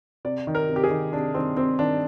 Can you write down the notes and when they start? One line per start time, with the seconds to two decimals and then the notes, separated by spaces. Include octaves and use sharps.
0.25 C3 D5
0.47 D#3
0.55 A#4
0.69 C3
0.76 G4
0.84 G#4
0.91 D#3
1.13 C3 D4
1.34 D#3 C4
1.57 C3 C4
1.79 D#3 D4